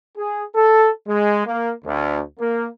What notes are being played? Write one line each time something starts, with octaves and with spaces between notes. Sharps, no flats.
G#4
A4
G#3
A#3
D2
A#3